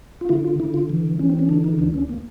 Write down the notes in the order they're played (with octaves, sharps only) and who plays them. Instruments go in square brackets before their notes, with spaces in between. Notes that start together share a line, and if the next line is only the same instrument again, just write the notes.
[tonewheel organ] F4
D3 E4
F4
D3 E4
F4
E3
E3 C#4
C4
C#4
D3 D4
D#4
D2 D4
C#4
A#3